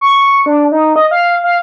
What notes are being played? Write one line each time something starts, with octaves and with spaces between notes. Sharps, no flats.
C#6
D4
D#4
D#5
F5
F5